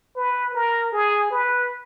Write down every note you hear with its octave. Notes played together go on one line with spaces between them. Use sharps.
B4
A#4
G#4
B4